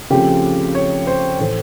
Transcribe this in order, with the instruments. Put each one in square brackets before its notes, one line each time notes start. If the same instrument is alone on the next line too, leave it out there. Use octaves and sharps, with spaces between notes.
[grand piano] C#3 F3 A3 C4 G4
C#5
C5
A2 E3 A3 C5